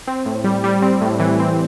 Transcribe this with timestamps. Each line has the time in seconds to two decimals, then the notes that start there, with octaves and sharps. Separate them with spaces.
0.07 C4
0.26 A2
0.44 G3
0.64 G3
0.82 C4
1.01 A2
1.20 E3
1.40 C4